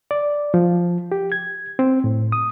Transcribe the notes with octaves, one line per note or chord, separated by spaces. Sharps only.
D5
F3
G4
G#6
C4
A2
D#6